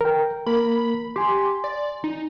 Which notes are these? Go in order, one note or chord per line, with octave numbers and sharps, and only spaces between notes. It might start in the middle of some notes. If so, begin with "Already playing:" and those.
A#4 G5
A#3 A#4 B5
G4 G#5 C6
D5
D#4